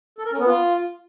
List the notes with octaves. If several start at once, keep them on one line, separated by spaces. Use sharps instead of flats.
A4
A#4
C#4
B3
F4